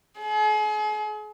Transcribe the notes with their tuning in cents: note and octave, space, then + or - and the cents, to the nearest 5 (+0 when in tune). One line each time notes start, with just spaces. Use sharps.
G#4 +40